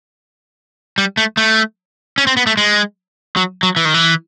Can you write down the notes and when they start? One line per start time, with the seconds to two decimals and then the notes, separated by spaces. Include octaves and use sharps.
0.98 G3
1.17 A3
1.37 A3
2.18 C#4
2.27 C4
2.37 B3
2.47 A3
2.57 G#3
3.37 F#3
3.63 F#3
3.76 E3
3.85 D#3
3.94 E3